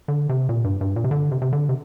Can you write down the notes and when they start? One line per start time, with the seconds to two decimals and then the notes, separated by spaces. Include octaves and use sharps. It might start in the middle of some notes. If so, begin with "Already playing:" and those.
0.08 D3
0.29 C3
0.49 A#2
0.64 G2
0.81 G2
0.96 A#2
1.04 C3
1.11 D3
1.31 C3
1.42 C3
1.53 D3
1.69 C3